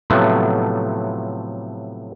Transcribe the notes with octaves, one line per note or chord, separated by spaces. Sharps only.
A2 C3 F3 F#3 A3 B3